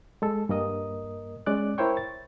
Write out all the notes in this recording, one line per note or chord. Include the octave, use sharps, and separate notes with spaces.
G#3 A4
G2 A#3 A#4 D#5 D#6
G#3 C#4 D5 D6 F#6
E4 A#4 C5 C#5 G5 C#6
A6